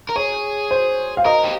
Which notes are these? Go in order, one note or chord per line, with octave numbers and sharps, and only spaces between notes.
A#4
G#4 C#5
C5
F5
A#4 D#5
G4